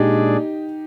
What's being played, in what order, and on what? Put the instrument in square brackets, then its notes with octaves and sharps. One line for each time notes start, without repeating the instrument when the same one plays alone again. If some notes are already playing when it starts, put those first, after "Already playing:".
Already playing: [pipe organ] A#2 G#3 D4 G#4 D5 [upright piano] D#4 G4